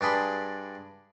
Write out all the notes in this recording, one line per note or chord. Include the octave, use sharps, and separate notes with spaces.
G2 D4 G#4 B5 C6